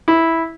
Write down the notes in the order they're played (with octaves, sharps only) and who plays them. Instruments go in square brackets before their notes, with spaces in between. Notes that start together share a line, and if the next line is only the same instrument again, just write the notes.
[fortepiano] E4